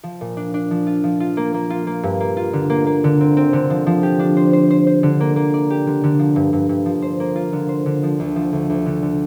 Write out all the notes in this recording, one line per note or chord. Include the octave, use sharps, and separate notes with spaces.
F3
A#2
D4
D4
F3
F4
F3
F4
A#3
A#3
F4
A#3
G2
A#3
F4
D3
A#3
A#3
D3
C4
C4
D3
F3
F3
G4
D4
C5
C5
C5
C5
D3
A#3
A#3
D5
G4
D3
D3
F3
G2
G2
G2
F3
C5
A#3
F4
D3
C5
D3
F3
D2
F3
D2
D2
D3
D3